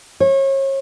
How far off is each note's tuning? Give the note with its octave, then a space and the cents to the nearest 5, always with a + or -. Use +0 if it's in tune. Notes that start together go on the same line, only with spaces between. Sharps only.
C#5 -35